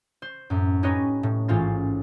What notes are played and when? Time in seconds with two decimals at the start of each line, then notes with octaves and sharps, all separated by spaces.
0.22 C5
0.50 F#2 A2
0.83 C#4 D#4 G4 B4 C#5 D#5
1.23 A2
1.48 A1 G#2 C#4 F4 C5 A6